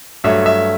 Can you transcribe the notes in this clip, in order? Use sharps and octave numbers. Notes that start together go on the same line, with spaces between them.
G2 F#3 A3 E5
E5